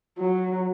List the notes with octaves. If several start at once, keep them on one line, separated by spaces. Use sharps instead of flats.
F#3